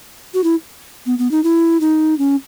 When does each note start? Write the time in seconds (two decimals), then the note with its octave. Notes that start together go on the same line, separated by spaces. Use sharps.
0.34 F#4
0.44 E4
1.06 B3
1.19 B3
1.31 D#4
1.44 E4
1.81 D#4
2.19 C#4